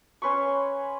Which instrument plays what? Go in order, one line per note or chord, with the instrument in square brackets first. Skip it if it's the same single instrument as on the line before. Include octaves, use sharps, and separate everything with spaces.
[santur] C#4 B4 C6 C#6